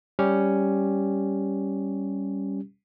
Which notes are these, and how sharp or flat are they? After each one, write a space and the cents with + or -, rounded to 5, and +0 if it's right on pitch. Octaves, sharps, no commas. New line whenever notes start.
G3 +0 C#4 +0 G4 +0